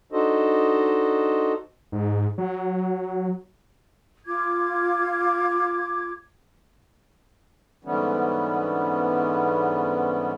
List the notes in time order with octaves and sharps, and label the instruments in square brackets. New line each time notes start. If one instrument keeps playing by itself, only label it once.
[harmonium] D4 D#4 F#4 A4 C5 D#5
[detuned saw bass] G#2
F#3
[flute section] F4 D6 G#6
[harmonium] G#2 D3 E3 G3 B3 C#4